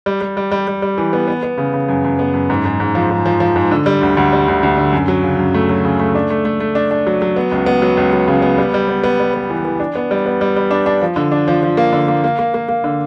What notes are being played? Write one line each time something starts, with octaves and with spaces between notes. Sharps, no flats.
G3
G3
G3
G3
G3
G3
E3
B3
B3
B3
C#3
C#3
F#2
F#2
B3
F#2
G#2
G#2
G#2
F3
G#2
F3
F3
G#2
D3
G3
D2
D2
G3
D2
D2
D3
F#2
F#3
C#3
F#2
A3
F#3
C#3
A3
D4
A3
A3
A3
D4
D4
F#3
F#3
B3
C#2
B3
F#3
C#2
F#3
C#3
B3
G3
G3
B3
B3
G3
B3
E3
E3
D4
B3
G3
B3
G3
G3
D4
D4
F3
D3
D4
F3
F3
A#3
D3
A#3
A#3
A#3
A#3
A#3
D3